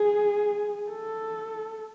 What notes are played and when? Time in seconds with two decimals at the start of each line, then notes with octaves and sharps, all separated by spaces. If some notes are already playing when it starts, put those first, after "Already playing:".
Already playing: G#4
0.90 A4